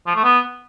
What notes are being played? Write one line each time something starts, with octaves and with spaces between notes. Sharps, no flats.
F3
A3
B3